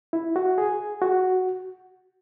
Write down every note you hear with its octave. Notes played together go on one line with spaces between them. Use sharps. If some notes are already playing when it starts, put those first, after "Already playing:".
E4
F#4
G#4
F#4